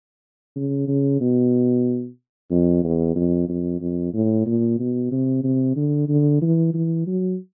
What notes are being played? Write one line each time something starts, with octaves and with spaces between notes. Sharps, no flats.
C#3
C#3
B2
F2
E2
F2
F2
F2
A2
A#2
B2
C3
C3
D3
D3
E3
E3
F#3